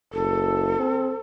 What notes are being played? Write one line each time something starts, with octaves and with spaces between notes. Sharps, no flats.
F#1 A4
C4